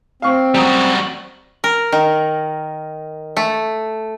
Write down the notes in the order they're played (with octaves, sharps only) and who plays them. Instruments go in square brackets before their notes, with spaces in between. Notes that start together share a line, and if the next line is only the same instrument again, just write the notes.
[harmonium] C4 [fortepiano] F5 C#6
[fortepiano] F#2 A#5 D#6 [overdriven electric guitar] G3 F#4
[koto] A#4
D#3
A3